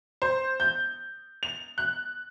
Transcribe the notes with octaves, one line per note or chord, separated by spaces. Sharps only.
C5
G6
F7
F#6